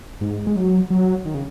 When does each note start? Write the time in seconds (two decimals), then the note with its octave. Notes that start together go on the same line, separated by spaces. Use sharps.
0.21 G#2
0.47 G#3
0.56 F#3
0.90 F#3
1.25 D#3
1.34 C#3